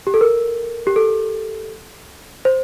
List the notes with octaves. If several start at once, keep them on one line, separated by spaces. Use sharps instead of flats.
G4
A4
A#4
G4
A4
C5